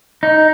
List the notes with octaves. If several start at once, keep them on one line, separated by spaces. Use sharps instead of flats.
D#4